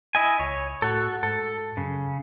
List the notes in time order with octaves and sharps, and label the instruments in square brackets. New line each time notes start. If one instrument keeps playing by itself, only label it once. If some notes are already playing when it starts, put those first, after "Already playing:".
[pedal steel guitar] E4 D#5 G#5
[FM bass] C#2 [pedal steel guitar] C#5
[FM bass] A2 [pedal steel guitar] F#4 A4
[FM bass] G#2 [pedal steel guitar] A4
[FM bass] F#2 [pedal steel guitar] C#3